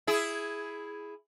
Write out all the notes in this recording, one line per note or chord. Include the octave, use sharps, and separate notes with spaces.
E4 G#4